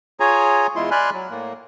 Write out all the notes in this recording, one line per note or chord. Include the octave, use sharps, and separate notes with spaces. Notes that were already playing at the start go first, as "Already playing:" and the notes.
F4 G#4 C#5 G#5 A#5
E2 G#3 E4 F4 C6
D5 G#5 B5 C6 F6 F#6
F#3
A2 A#3